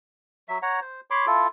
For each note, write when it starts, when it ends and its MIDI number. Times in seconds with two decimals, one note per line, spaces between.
0.49 0.58 54
0.49 0.58 76
0.62 0.80 73
0.62 0.80 78
0.62 0.80 82
0.82 1.01 72
1.10 1.26 73
1.10 1.26 83
1.10 1.26 84
1.10 1.26 86
1.27 1.48 64
1.27 1.48 65
1.27 1.48 69